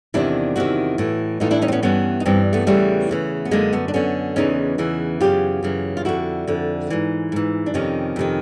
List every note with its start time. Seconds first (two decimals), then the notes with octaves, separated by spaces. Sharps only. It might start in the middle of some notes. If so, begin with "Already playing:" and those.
0.14 E2 C3 D#3 D4 E4
0.56 E2 C3 D#3 E4 F#4
0.98 A2 E3
1.40 A2 E3 D#4 F4
1.51 D4 E4
1.62 C#4 D#4
1.68 C4
1.72 B3 C#4
1.83 G2 E3 B3 C#4
2.20 D#4
2.26 G2 E3 C4 D4
2.53 A3 B3
2.67 E2 C#3 E3 G3 A3
3.09 E2 C#3 E3
3.45 B3
3.51 F#2 D3 G#3 A#3
3.73 A3 B3
3.88 D4
3.94 F#2 D3 B3 C#4
4.36 E2 C#3 E3 C#4 D#4
4.78 E2 C#3 E3
5.20 F#2 C#3 E3 F4 G4
5.63 F#2 C#3 E3
5.97 F4
6.05 F2 D3 E4 F#4
6.47 F2 D3
6.90 G#2 E3
7.32 G#2 E3
7.66 D4
7.74 F2 C3 D#3 C#4 D#4
8.16 F2 C3 D#3